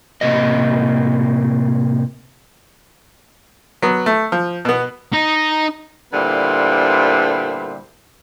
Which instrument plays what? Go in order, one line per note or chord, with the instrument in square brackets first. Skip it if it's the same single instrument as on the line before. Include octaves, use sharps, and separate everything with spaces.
[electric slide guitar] A2 C3 A#3 D#5
[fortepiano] F#3 B3
A3
F3
B2 B3
[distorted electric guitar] D#4
[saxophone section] A#2 D3 G3 B3 E4 C5